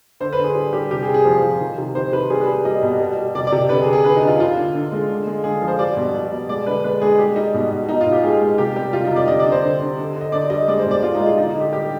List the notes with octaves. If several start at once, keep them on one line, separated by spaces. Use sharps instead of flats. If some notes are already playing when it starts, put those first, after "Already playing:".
D3 C5
B4
D3
G#4
G3
G3 G4
C3 G4
G#4
C3
G#4
F3 C5
F3
D#3
C3
D#3 C5
C3 B4
G3 G#4
B4
G3
G3 D#5
B2
G3
G3
C3 D5
D5
C3
D3 B4
G#4
D3
G#4
D3 B4
D#4
D3 F4
D3 F4
D3
D3
G#3
D3
G#3
D3 G#4
F3
C5
G3 D5
B2
G3
B2
G#3 D5
D3 B4
G#3 B4
G#3 G#4
G3 G4
G3 D#4
B2
B2
B2 D#4
F4
B2
G4
G#3 G#4
G#3
C3 G4
G3 G4
C3 F4
D#4
C3
D5
D3 D#5
D5
D3
C5
D3
D3
D3
D3
D#5
D3 D5
G3 D#5
G#3 D5
C5
B2
D5
G#3 F4
D#4
G#3
F4
D3 D#4
D#4
D3
G4
G3 G4